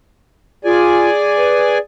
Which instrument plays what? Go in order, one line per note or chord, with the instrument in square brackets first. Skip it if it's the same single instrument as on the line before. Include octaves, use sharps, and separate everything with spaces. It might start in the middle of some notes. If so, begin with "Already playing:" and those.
[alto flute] F4 [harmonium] G#4 D5 G#5
[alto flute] B4